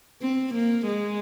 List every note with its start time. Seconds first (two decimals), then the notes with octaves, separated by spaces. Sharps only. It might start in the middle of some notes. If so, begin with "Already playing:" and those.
0.21 C4
0.54 A#3
0.87 G#3